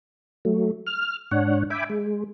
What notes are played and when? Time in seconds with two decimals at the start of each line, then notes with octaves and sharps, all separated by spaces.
0.45 F#3 A3
0.87 F6
1.31 G#2 D4 C#5 F#5
1.70 E5 G5 G#5 B5 D6
1.90 G#3